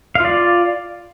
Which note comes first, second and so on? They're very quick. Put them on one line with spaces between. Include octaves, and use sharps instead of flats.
F5 F4 D5